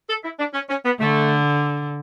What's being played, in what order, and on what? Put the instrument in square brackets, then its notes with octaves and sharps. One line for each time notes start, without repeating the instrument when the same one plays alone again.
[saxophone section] A4
E4
D4
C#4
C#4
B3
[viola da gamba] D3 [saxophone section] A3